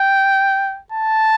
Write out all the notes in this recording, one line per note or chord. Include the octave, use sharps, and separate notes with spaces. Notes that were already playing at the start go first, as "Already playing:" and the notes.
Already playing: G5
A5